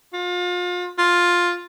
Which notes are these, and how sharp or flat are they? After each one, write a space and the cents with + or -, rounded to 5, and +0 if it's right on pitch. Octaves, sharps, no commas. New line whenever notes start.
F4 +35
F4 +10